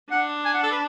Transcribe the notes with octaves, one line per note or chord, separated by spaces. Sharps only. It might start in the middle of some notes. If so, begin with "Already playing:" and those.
D4 F#5
G#5
F#5
A4
B4